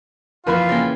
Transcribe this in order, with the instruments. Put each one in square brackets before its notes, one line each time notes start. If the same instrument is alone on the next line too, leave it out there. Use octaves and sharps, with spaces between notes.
[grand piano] F2 B4 B5 [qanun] E3 A#3 E5 [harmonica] F4
[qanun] C#3 A#4 G5 [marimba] A#3 A6